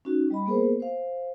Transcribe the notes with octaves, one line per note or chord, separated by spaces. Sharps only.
C#4 D#4 F#4
G3 D#5 B5
A#3 B3 G#4 A#4 C5
C5 F5